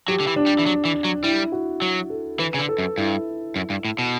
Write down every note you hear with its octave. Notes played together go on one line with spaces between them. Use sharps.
F#3 G4
D3
E3
D4
G3
E3
F#3
E3
F#3
G3 E4
F#4
F#3
A4
E3 B4
C#3
D3
A4
F#2
G2 E4
F#2
G2
A2
B2